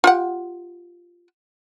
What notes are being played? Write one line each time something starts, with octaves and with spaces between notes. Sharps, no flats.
F4 G4 F#5